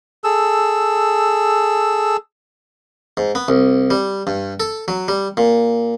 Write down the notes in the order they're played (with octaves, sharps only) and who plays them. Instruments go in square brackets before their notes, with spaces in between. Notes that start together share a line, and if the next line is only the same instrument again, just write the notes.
[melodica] G#4 A4 E6
[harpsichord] G#2
B3
C2
G3
G2
A4
F#3
G3
A#2